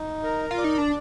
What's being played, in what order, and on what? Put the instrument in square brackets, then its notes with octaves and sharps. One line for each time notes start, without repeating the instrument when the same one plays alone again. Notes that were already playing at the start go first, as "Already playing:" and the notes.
Already playing: [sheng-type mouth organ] D#4
A#4
[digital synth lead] F4
[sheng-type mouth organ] D5
[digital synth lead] D#4
D4